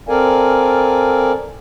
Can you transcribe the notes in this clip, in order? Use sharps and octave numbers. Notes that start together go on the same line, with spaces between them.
C4 A4 A#4 D5 F5 G#5